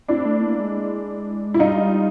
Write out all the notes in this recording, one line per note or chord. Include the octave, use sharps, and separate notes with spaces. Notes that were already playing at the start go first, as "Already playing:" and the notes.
C4 D4 E4
A3
A#3
G#3
E4
G3 D#4 F4